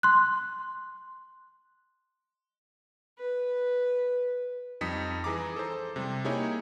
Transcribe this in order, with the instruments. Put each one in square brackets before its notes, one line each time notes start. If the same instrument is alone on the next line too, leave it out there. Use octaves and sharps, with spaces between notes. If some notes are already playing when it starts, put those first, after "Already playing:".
[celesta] C6 F#6
[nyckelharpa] B4
[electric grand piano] F2 G3 D#4 D#6 B6 C#7
E3 G#4 A#5 D6
A4 C5
C3 G3
A#3 D#4 E4 G4 G#4 C#5